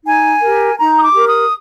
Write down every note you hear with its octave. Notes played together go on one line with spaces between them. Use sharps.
D#4 G#5
G4 A#4
D#4 A#5
D#6
D6
G4 A#4
D#6